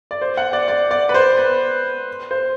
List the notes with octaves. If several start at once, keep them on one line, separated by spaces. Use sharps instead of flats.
D5
C5
F#5
D5
D5
D5
B4
C5
B4
C5